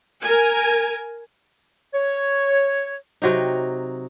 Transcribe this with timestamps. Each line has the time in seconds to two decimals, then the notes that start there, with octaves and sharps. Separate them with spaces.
0.22 A#4 G#5
1.94 C#5
3.22 C3 F#3 D#4